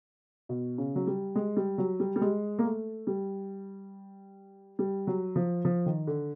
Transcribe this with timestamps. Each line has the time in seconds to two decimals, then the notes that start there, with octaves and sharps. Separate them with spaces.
0.49 B2
0.78 C#3
0.96 F#3
1.07 G3
1.35 G#3
1.57 G3
1.78 F#3
2.00 G3
2.16 G3
2.21 G#3
2.59 A#3
2.64 A3
3.07 G3
4.79 G3
5.07 F#3
5.36 F3
5.65 F3
5.86 D#3
6.07 D3